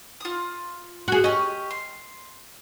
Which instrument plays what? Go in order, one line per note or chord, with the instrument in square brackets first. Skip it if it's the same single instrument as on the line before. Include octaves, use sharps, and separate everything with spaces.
[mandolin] F4 D#6
[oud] F#4 G#4
[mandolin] C#4 G4 [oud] D#5
[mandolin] C6